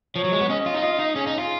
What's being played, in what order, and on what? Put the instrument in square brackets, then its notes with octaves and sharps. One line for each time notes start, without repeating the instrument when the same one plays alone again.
[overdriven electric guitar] F3 [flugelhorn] C#5
[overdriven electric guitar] F#3
G#3
B3
[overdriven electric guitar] C#4 [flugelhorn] D#5
[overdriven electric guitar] F4
D#4
[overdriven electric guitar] F4 [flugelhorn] D#5
[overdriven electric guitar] D#4
[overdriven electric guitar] C#4 [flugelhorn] G#4
[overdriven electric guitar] D#4
F4